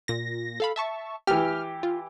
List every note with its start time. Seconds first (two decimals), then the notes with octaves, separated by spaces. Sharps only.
0.08 A#2 A#6
0.60 A4 F5 B5
0.76 E5 A5 C#6
1.27 E3 G4 F6
1.83 F4